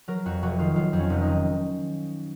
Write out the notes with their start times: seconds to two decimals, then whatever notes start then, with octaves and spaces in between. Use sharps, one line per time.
0.08 F#3 A#4
0.26 F2 F#4
0.42 F1 F#4
0.59 D#3 F4
0.76 F#3 F4
0.93 F2
0.99 C#4
1.10 F1
1.21 D#4
1.27 D#3